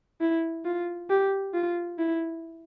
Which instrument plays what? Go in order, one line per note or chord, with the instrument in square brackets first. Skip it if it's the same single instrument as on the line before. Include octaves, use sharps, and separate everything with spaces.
[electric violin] E4
F4
G4
F4
E4